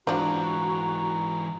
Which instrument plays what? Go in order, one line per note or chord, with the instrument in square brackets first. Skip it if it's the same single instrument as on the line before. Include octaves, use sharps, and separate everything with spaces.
[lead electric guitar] G#2 E3 [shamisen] F3 D4 [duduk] F#4 [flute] A#5